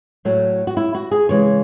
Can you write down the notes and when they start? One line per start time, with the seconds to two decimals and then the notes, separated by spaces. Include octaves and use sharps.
0.25 A2 F#3 A3
0.67 F#4
0.77 E4
0.95 F#4
1.11 G#4
1.29 C#3 E3 G#3 C#5